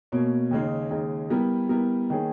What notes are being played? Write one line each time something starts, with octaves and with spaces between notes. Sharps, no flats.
B2 A#3 C#4
D#2 C#3 G#3 D#4
D#2 C#3 G#3 D#4
G3 B3 E4 A#4
G3 B3 E4 A#4
D#3 A#3 C#4 G#4